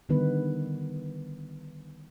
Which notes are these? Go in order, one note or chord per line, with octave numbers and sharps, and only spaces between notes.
D3 D#3 G3 B3 D#4 B4